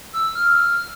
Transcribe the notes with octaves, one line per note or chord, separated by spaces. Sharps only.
E6
E6
F6